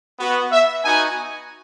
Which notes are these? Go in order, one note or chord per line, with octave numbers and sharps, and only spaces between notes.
B3 F#4
E5
B3 D#4 F#4 G#5